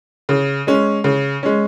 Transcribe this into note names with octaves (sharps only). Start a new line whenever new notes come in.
C#3
G#3 C#4
C#3
G#3 C#4